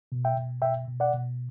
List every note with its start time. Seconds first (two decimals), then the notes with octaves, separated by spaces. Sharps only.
0.12 B2
0.25 E5 G5
0.37 B2
0.62 B2 E5 G5
0.88 B2
1.00 D5 F#5
1.14 B2